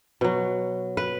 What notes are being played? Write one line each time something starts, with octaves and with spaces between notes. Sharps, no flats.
B2 F#3
B4